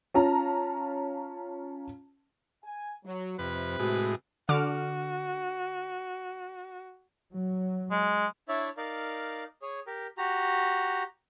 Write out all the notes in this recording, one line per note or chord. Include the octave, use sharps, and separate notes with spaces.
C#4 F4 A5 A#5
G#5
F#3
F2 C3 B4
A2 G#3 F#4
D3 F#4 D6 F6
F#3
G#3
D4 E4 C#5 D5 E5
D#4 A#4 D5 F5
G#4 C#5
G4 A#4
F#4 G4 A#5